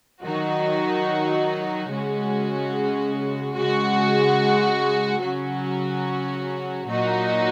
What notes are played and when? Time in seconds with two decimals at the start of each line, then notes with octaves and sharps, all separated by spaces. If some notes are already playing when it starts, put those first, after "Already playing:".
0.24 D#3 F#3 D#4 F#4
1.90 C#3 G#3 C#4 F#4
3.55 C#3 G#3 F#4
5.21 C#3 F#3 C#4 F#4
6.87 A#2 F#3 D#4 F#4